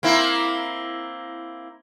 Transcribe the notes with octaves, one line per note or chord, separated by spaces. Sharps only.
A#3 C4 E4